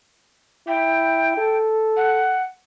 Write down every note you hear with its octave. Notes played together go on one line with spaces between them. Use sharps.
E4 G5
A4
F#5